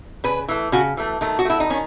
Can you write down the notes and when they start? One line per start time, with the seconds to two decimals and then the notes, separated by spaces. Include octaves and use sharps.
0.24 C#3 B4
0.48 E3 A3
0.72 C#3 F#4
0.97 E3 A3
1.21 D#3 A3
1.39 F#4
1.45 A3 E4
1.60 D#4
1.70 D#3 C#4